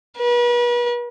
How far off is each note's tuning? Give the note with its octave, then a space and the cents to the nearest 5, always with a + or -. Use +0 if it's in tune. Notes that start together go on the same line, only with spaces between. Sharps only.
B4 -40